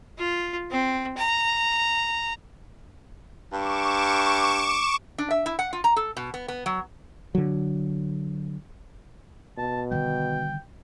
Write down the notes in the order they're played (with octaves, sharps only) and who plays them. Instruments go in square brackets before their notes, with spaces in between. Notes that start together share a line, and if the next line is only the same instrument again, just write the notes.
[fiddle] F4
C4
A#5
[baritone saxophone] G2 [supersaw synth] C#6 D6 E7
[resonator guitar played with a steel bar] D4
E5
E4
F#5
F4
A#5
A4
B2
B3
B3
F#3
[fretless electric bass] D3 F#3
[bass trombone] B2 [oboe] A5
[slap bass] D3 D#3 G3 [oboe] G5